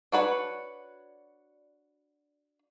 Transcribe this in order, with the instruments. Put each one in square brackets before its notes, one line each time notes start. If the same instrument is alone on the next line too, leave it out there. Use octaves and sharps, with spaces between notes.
[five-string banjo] D4 F#4 B4 C#5